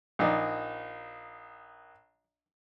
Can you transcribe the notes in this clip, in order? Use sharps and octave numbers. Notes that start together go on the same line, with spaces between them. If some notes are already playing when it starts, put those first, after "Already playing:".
A#1 D#4 D5